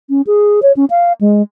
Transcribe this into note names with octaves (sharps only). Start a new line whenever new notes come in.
C#4
G#4
C#5
C#4
F5
G#3